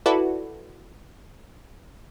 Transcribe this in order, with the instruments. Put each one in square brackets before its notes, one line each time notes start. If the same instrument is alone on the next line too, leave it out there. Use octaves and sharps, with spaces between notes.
[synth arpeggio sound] E4 F#4 A4 B4 D5